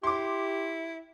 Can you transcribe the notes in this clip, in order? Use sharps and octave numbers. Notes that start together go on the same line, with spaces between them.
E4 G4 C6 D6